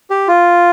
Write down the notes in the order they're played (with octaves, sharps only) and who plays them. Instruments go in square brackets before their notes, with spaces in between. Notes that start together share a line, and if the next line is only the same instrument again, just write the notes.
[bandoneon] G4
F4